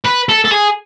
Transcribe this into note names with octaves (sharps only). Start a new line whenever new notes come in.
B4
A4
A4
G#4